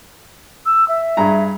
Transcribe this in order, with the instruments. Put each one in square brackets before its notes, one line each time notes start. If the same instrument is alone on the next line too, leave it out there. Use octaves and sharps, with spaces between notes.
[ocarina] E6
E5
[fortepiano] G2 G#4 A#5